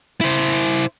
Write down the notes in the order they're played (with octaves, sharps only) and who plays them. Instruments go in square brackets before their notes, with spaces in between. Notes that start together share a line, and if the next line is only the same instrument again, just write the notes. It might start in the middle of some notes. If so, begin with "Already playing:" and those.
[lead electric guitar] E4 C5